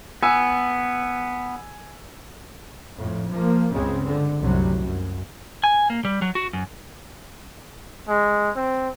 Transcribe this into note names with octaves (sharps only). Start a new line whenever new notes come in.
B3 G#5 E6
F2 A2
F3 A#3
C#2 G2 C#3 G#3 C4
D3
C2 F#2 A2 C3 F#3 G3
F#2
G#5
A#3
G3
F#3
F#4
F#2
G#3
C4